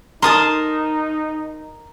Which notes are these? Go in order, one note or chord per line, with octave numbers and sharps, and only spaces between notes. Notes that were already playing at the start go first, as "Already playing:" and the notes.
D#4 A#4 A5 C6 D#6